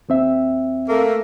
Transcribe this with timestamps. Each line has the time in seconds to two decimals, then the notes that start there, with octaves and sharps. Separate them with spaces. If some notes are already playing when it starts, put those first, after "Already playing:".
0.09 D#2 C4 E5
0.89 A3 A#3